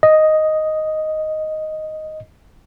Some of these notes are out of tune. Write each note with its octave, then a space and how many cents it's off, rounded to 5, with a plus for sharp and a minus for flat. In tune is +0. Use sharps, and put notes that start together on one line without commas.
D#5 +0